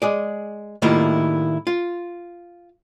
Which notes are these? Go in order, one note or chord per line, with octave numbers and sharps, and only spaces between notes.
G#3 G#4 D5
A2 D#3 G3 A#3 E4 F4
F4